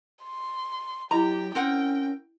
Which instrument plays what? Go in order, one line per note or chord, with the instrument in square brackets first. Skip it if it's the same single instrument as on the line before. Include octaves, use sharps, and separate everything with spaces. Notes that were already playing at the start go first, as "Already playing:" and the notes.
[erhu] C6
[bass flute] F#3 [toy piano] E4 D#5 B5 [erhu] G4 [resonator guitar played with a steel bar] A#5
[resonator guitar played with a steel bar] C4 A#4 F#5 [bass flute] C#4 [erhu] G5